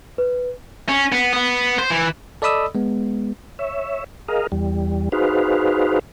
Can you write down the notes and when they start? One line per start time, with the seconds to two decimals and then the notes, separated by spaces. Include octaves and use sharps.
0.18 B4
0.89 C#4
1.12 B3
1.34 B3
1.79 C5
1.90 E3
2.42 A4 D5 D#5 B5 D#6 E6
2.75 G#3 B3
3.59 C#5 E5
4.28 G#4 A#4 D#5 F5
4.52 E2 G3
5.12 D#4 F#4 G#4 B4 C5 F5